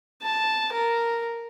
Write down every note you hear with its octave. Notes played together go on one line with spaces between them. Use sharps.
A5
A#4